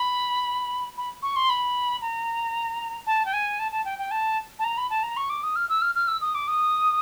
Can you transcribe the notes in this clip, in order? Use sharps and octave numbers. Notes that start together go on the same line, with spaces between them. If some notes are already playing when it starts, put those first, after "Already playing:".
Already playing: B5
B5
C#6
C6
B5
A#5
A5
G5
G#5
A5
A5
G5
G5
A5
A5
A#5
B5
A5
A#5
C#6
D6
D#6
F6
E6
F6
F6
E6
D#6
D6
D#6